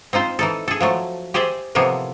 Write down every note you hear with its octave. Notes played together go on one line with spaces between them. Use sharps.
C4 D#4 F4 C5
E3 D#4 A4
G#4 A4
F3 F#3 A3
G4 G#4 C5 D5 E5
A2 C3 E3 F3 A#3 B3